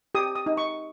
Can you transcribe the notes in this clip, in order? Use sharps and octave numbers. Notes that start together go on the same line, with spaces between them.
G4 D#6
D#6
D#4
C#6